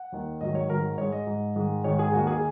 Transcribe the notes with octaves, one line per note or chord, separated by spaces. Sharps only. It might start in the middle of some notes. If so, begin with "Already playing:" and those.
Already playing: F#5
D#2 D#3 A#3
G#2 D#3 F#3 D#5
C#5
G#2 D#3 F#3 A#4
G#2 G#3 C#5
D#5
G#2 G#3
G#2 D#3 G#3
G#2 D#3 G#3 C#5
G#4
D#2 D#3 A#3 F#4
G#4